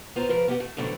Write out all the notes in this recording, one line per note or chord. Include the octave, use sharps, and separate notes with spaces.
B3 F4 C5 A#5
C#3 F3 A#4 B4
B3 G4 F#5
A3
F2 A2 D3 F#3 A3 B3